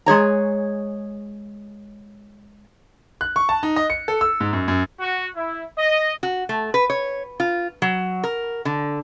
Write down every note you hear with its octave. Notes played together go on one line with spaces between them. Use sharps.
G#3 G#4 C#5 A#5
F#6
C#6
A5
D#4
D#5
C#7
A4
E6
G#2
F#2
F#2
F#4
E4
D#5
F#4
A3
B4
C#5
F4
F#3
A#4
D3